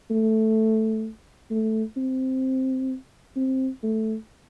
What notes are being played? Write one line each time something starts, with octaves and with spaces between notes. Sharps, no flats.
A3
A3
C4
C4
A3